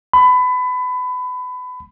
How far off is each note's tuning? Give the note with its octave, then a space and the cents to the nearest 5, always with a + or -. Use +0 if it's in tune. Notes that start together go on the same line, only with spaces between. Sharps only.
B5 +25